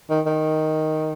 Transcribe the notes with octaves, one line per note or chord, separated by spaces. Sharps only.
D#3
D#3